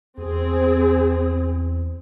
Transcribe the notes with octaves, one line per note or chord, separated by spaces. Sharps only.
E2 C4 G#4